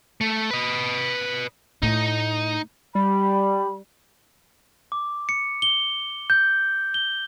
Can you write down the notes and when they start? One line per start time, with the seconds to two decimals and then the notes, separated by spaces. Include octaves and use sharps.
0.21 A3
0.51 B4 D#5
1.82 A2 D#4
2.95 G3 B5
4.92 D6
5.29 C#7
5.62 G7
6.30 G6
6.94 G7